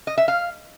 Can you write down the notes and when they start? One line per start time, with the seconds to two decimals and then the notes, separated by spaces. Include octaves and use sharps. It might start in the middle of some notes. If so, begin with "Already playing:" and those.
0.07 D#5
0.18 E5
0.28 F5